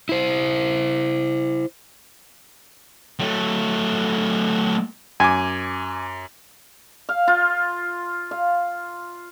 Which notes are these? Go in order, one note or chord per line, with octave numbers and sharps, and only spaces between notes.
E4 C5
F#3 A3
F#2 G#5 D6
F5
F4
F5